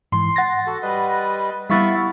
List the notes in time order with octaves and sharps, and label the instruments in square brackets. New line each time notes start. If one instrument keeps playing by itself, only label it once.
[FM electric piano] G#2 E3 [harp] C6
[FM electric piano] F#5 A6 A#6
[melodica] F#4 A4
G3 B4 D#5
[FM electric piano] G3 C#6 A6 [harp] B3 E4 B6 [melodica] E5 F5